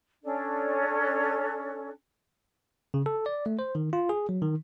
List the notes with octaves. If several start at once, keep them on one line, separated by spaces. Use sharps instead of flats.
C#4 D4 A4
C#3
A4
D5
A3
C5
D#3
F4
G#4
F#3
D#3